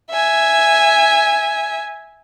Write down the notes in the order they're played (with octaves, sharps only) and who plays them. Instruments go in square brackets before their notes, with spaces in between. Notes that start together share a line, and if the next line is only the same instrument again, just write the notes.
[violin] E5 G#5